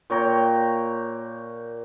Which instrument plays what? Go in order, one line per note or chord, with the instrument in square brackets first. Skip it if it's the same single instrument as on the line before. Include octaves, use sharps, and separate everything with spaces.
[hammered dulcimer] A#2 C#5 G5 A#5